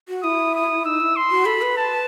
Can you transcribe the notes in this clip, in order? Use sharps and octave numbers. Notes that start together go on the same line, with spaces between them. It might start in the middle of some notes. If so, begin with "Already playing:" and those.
F#4
E4 D#6
D#6
D#4 E6
E4
C6
F#4
A4 B5
B4
A5